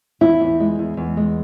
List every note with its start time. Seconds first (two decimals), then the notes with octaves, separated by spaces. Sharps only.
0.21 E2 E4
0.40 E2
0.60 G#3
0.79 E2
0.97 E2
1.17 G#3